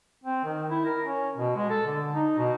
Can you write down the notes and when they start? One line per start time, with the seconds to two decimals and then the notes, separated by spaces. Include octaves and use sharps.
0.24 C4
0.44 D#3
0.70 E4
0.85 A#4
1.05 C#4
1.38 B2
1.56 G#3
1.70 A4
1.86 D3
2.13 D#4
2.38 B2